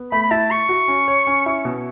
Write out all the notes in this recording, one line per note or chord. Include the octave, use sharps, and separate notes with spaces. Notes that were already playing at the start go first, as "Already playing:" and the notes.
Already playing: B3
A3 B5
B5
E4 A5
E4 C#6
F#4
C#4
C#5
C#4
E4
B2